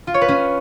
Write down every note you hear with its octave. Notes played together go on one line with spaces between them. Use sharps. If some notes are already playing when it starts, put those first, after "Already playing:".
F4
C#5
B4
C#4